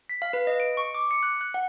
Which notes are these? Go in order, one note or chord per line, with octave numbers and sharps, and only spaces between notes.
B6
F5
B4
D#5
D7
C#6
D6
C#7
F#6
F#6
F#5